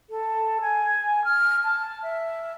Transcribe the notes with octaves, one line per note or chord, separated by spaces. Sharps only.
A4
G#5
F6
A5
E5